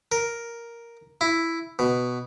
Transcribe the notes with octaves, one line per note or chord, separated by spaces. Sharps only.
A#4
E4
B2